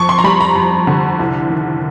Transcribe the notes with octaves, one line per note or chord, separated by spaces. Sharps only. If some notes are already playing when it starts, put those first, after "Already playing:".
Already playing: F2 C#6
C6
A#5
G3 B5
A#5
F2
D3
C2
D#3